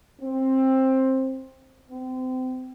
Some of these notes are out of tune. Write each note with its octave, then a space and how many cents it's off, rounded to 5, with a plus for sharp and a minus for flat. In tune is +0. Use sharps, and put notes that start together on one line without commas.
C4 +15
C4 -30